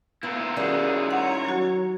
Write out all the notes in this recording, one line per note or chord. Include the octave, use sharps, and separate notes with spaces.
B3 E4 F4 A#4
D#3 G3 C#4 F#4 G#4
C#5 F#5 A#5
F#3 F#4